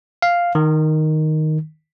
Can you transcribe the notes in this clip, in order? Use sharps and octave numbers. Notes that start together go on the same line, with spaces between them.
F5
D#3